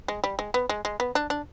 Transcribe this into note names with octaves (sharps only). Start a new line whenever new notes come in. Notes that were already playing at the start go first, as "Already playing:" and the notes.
G#3
G3
G#3
B3
G#3
G#3
B3
D4
D4